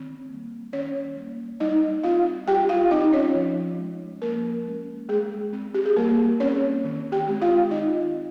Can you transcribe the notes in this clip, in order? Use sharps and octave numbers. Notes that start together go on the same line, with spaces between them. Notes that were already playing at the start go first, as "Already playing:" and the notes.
Already playing: D#3 C4
A#3
G3
D#3 C#4 C#5
G3 A#3
G3 D#4 D#5
C4 F4 F5
G3 G4 G5
F4 F5
C4 D#4 D#5
C#4 C#5
F3
G#3 C#4
F3 A#3 A#4
G#3 C#4
G3 G#3 G#4
C4
G4
G#4
G3 A#3 A#4
C4 C#4 C#5
D#3
G4 G5
G#3 C4
F4 F5
D#3 D#4 D#5
C4